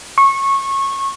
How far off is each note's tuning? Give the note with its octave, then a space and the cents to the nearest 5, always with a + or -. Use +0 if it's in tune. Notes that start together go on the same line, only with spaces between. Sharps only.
C#6 -20